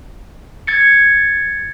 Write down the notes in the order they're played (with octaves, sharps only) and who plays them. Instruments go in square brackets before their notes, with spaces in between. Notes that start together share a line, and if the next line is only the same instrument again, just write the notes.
[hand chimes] G#6 A6 C#7